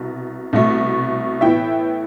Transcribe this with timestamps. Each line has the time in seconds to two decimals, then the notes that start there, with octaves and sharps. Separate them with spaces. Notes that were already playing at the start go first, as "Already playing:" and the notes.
Already playing: C2 B2
0.53 C2 B2 A3
1.41 A2 E3 B3 E4 E5 G5